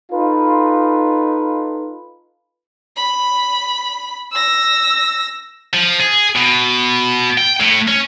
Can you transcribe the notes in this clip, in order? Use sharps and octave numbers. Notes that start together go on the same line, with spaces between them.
D#4 F4 A4 B4
B5
E6 A#6
F3
G#4
B2
G5
A2
C#4